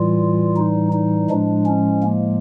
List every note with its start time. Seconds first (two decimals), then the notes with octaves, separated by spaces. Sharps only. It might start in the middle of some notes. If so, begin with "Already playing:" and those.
Already playing: A2 E3 G3 F4
0.57 D#4
0.93 D#4
1.30 A2 F3 G#3 D4
1.66 C#4
2.03 A#3